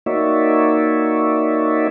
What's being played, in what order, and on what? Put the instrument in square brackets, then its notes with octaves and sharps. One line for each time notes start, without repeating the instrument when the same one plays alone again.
[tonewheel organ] A#3 D#4 F#4 C#5 D5 E5